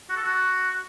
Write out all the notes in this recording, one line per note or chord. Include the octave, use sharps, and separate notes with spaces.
F#4
A4
F#4